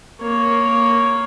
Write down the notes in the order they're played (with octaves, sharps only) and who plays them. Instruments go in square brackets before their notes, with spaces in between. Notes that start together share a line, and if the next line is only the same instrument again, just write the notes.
[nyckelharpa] A#3 C#5